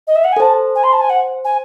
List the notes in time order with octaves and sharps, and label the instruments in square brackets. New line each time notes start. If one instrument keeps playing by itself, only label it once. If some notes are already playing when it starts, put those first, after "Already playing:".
[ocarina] D#5
E5
F#5
G#5
[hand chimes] A4
[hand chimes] C5 [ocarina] A5
[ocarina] G#5
C6
A5
G#5
F#5
G#5